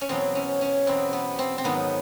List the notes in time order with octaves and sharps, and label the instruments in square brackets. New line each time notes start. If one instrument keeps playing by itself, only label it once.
[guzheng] C#4
E2 B2 F#3 C4
C#4
C#4
E2 B2 F#3 C4
B3
C4
C4
G#2 D#3 F#3 B3